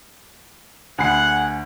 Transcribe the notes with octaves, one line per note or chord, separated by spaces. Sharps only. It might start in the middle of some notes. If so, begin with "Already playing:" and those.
D2 G#4 F#5 G#5 B5 F#6 C7